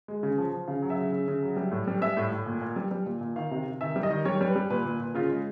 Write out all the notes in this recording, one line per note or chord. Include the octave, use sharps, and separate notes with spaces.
G#3
C#3
F3
F3
C#3 F5
F#3
E5
C#3
C#3
C#3
F#3
G3
A2
G3
G3 E5
A2
A2
A#2
A#2
G3
G3
A#2
A#2
D#3 F5
C3
C3
D#3 E5
G3
D#5
D#3
G3 C#5
G3
B4
G3
A#2 B4
A#2
A#2
C#3 F4
G#3